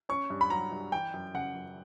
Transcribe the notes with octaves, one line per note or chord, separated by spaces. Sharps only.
C#4 C#6
G2
B5
F#3 A#5
G2
E3 G5
F#2
C#3 F#5
F#2